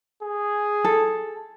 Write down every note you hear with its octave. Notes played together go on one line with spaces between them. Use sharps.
G#4
A4